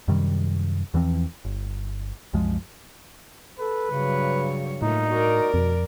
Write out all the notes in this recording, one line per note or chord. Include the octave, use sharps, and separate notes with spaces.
F#2 C3 D#3 G3
E2 E3 F3 C4
G1
C2 F#2 F3 G#3
A4 B4
G2 C#3 F#3 C#5
A2 A3 A#3 D#4 F4
F#4 A#4 D5
F2 B2